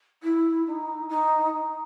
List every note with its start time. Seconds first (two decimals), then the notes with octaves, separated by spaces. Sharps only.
0.22 E4
0.66 D#4
1.08 D#4